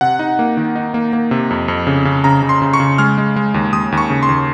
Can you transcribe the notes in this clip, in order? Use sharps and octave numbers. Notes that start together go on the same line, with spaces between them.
C3 F#5
D#4
A#3
D#3
D#4
A#3
A#3
C3
F2
F2
C#3
C#3
C#3 A#5
C#3
C6
C#3
C#6
C#3
G#3 F6
G#3
G#3
D#2
D#2 D#6
D#2
C#6
C#3
C6
D#2